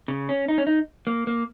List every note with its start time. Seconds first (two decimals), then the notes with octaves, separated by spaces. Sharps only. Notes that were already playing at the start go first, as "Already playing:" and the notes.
0.08 C#3
0.29 C#4
0.48 D#4
0.58 C#4
0.67 D#4
1.07 A#3
1.27 A#3